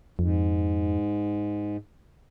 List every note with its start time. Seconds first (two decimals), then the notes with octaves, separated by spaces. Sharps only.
0.19 F2 G#2